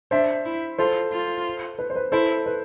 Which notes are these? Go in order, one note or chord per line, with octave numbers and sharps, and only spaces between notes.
D4 C5 E5
E4
F4 A4 C5
F4
B4
C5
B4
E4 A4 C5
B4